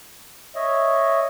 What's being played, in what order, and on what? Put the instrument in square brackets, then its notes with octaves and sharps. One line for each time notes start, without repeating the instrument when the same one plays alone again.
[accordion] C#5 D#5 E5